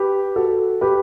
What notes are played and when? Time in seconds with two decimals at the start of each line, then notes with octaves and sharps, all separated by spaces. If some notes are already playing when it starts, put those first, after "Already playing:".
Already playing: G4 B4
0.36 F#4 A4
0.81 G4 B4